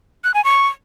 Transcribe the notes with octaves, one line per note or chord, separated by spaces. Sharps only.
F#6
G#5
C#6